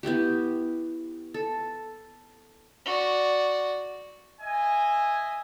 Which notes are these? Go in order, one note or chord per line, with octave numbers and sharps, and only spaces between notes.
B3 E4 F#4 G4
A4
F#4 D5
D#5 E5 G#5